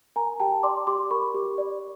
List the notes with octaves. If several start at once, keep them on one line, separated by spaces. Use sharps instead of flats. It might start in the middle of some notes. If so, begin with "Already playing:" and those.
A#4 G#5 A#5
G4 G5 A5
D5 C6 D6
G4 C6 D6
A#4 B5 C#6
G4
D5